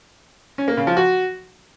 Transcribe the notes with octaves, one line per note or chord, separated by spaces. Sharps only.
C#4
A#3
C#3
F3
F#4